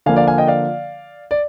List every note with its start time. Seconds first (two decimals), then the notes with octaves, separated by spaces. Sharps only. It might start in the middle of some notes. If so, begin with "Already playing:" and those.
0.06 D3 F3 A#3 F5 G#5
0.16 D5 F5
0.27 F5 G#5
0.38 D#5 G5
0.47 D5 F5
1.31 D5